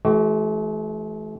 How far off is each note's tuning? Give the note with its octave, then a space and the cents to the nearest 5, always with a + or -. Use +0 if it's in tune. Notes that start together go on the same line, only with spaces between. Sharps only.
E3 +5 A3 -45 F#4 +35